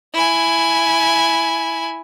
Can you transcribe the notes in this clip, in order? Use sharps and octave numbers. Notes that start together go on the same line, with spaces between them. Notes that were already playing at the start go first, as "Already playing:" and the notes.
E4 G#5